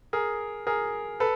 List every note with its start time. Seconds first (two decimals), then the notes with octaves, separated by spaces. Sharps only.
0.13 G#4 A#4
0.67 G#4 A#4
1.20 A4 B4